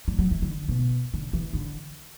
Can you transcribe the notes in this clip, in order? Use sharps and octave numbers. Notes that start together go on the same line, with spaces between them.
G3
F#3
E3
D3
B2
D3
E3
D3